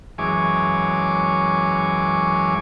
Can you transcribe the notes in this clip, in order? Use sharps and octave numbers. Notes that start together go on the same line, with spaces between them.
F#2 E3 G#3 C#5 G#5 D6